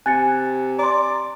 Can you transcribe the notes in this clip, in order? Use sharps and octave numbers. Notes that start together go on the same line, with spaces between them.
C3 G#5 F#6 A6 C#7
D5 A#5 C6